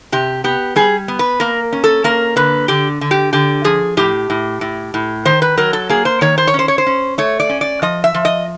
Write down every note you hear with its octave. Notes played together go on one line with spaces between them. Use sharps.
C3 G4
B3 G4
G3 G#4
B3
B4
A#3 A#4
C#4
A4
A#3 A#4
D3 B4
D3 G4
D3
G4
D3 G4
F3 G#4
A2 G4
A2
A2
A2
D#3 C5
B4
F#3 A#4
A4
A#3 G#4
C5
D#3 C#5
C5
C#5
C#4 C5
C#5
C5
C#4
A3 C#5
D5
C#4
D5
F3 D#5
E5
F3
D#5